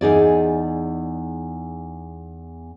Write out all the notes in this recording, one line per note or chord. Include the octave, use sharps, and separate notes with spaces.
E2 D#4 G#4 D5